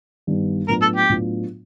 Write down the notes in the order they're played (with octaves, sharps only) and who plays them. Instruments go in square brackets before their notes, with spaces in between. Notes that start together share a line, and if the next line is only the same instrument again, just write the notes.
[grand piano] G2 D#3 G3 B3
[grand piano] A2 F#3 B3 D4 F4 [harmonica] A#4
[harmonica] A4
G4
[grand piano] A2 F#3 B3 D4 F4